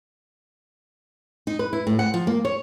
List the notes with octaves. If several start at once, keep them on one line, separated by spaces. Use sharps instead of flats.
D#4
B4
E4
A2
F#5
F3
A#3
C#5